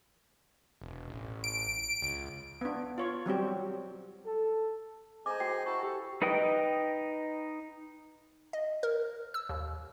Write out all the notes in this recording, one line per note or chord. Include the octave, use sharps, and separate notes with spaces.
E1
A1
D7
C#2
B3 D4
F4 C#5
F#3 G3 C4 G4
A4
G#4 C5 D#5 G#5 A#5 D6
F#4 G5 C7
E4 F#4 A5 C#6
G4 A4
D#4 B4 D#5 G5 D#6
D#5
A#4
E6
D#2